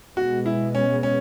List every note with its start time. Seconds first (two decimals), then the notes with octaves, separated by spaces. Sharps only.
0.17 B2 G#3 B3 F#4
0.46 E4
0.75 C#4
1.03 C#4